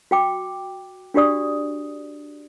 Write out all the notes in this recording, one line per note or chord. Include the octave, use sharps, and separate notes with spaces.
F#4 G5 D6
D4 F#4 G4 D5 D#6